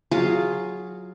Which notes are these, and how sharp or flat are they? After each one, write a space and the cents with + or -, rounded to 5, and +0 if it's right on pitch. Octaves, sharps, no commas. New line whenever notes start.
F#3 -15 F4 +0 G#4 +0